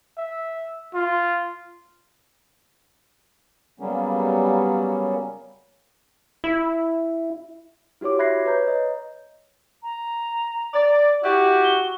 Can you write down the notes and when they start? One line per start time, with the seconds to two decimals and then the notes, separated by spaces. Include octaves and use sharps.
0.17 E5
0.94 F4
3.80 C#3 F#3 G3 A#3 B3 C#4
6.44 E4
8.01 E4 F#4 G4 C#5 D6
8.19 E5 B5 F#6 G#6 A#6 C7
8.46 B4 C#5 A#5 G6
8.67 D#5
9.83 A#5
10.73 D5
11.24 E4 F#4 G4
11.64 G7